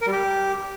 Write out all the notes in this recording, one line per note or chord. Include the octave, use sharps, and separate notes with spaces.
A#4
G3
G4